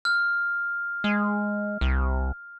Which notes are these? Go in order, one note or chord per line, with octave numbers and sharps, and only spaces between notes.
F6
G#3
C2